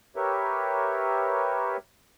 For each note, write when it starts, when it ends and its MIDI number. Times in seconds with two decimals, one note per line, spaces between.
0.16 1.77 67
0.16 1.77 70
0.16 1.77 71
0.16 1.77 73
0.16 1.77 76